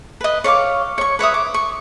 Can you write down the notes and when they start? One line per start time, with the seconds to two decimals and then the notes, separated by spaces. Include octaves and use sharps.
0.21 B4 D#5
0.44 C#5 D5 F5 D6
0.98 C#5 C#6
1.19 B4 C#5 E5 D#6
1.34 D6
1.54 C#6